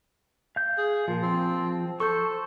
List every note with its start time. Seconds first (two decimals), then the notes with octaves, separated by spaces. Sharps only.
0.56 F5 G6
0.78 G#4
1.08 A#2 F3
1.23 C4
2.00 A4 C5 C#6